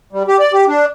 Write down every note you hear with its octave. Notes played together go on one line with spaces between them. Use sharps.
G3
G4
D5
G4
D4